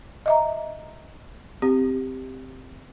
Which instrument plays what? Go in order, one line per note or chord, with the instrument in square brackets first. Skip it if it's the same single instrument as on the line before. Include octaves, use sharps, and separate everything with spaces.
[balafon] D#5 E5 A#5
C4 G4